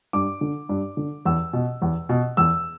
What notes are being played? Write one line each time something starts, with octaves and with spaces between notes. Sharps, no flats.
G2 D6
D3
G2
D3
E2 E6
B2
E2
B2
E2 E6